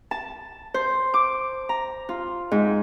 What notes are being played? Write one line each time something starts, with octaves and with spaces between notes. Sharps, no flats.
A5
C5
D6
A#5
F4
G#2